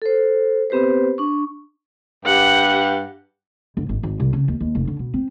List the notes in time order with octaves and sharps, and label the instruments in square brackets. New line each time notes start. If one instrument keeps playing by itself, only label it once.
[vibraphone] A4 C5
B3 C4 G4 B4 C5
D4 C#6
[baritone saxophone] G2 [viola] G4 F#5
[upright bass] G1
G#1
G#1
C2
C#3
D#2
D#2
F1
D3
B2
C4